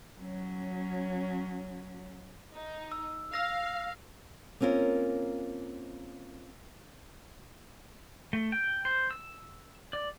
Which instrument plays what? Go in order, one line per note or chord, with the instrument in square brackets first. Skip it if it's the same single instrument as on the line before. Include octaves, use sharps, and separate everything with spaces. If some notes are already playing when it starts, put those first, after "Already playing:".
[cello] F#3 C#4
[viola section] D#4
[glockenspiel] E6
[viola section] F5 [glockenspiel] E6 A#6
[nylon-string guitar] A#3 C4 C#4 F4 A#4
[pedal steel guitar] A3
G5
C5
E6
D5